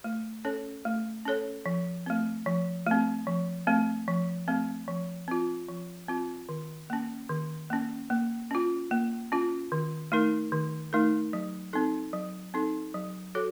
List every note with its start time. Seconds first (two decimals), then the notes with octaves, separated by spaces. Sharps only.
0.04 A3
0.45 C#4 A4 C#5
0.85 A3
1.25 C#4 A4 C#5
1.66 F3
2.06 A3 C4
2.46 F3
2.87 A3 C4
3.27 F3
3.67 A3 C4
4.08 F3
4.48 A3 C4
4.88 F3
5.28 C4 F4
5.69 F3
6.08 C4 F4
6.49 D#3
6.90 A#3 C#4
7.29 D#3
7.70 A#3 C#4
8.10 A#3
8.51 C#4 F4
8.91 A#3
9.32 C#4 F4
9.72 D#3
10.12 A3 D#4 A#4
10.52 D#3
10.93 A3 D#4 A#4
11.33 F#3
11.73 C4 D#4 A4
12.13 F#3
12.54 C4 D#4 A4
12.94 F#3
13.35 F#4 A4 C#5